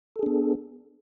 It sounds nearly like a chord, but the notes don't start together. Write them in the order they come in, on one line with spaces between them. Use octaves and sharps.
A4 G#4 D4 B3